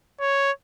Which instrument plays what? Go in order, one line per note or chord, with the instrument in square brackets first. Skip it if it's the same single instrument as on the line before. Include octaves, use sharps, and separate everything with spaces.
[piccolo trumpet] C#5